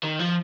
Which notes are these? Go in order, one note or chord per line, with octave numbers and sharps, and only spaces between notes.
D#3
F3